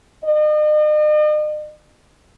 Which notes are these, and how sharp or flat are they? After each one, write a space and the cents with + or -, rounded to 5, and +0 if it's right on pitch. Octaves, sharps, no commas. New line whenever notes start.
D#5 -45